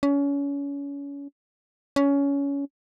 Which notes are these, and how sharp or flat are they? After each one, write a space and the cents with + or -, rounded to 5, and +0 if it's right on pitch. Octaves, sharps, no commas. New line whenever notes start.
C#4 +30
C#4 +20